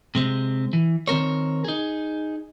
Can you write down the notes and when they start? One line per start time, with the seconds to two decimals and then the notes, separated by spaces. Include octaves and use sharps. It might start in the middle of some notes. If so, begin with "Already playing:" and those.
0.15 C3 G#3 C4
0.73 E3
1.08 D#3 C4 A#4 C#5
1.64 D#4 G#4